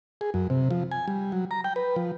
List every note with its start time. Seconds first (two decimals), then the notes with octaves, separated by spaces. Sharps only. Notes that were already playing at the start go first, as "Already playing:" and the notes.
0.21 G#4
0.34 F#2
0.50 C3
0.71 F3
0.91 G#5
1.08 G3
1.32 F#3
1.51 A#5
1.64 G5
1.76 B4
1.96 F3